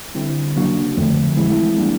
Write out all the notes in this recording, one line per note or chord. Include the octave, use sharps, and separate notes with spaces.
D3 G3 C4 E4
C#3 F#3 A#3 D4 F#4
F2 D3 F3 A3 C4
E3 G#3 C4 E4 G#4
G3 A#3 D4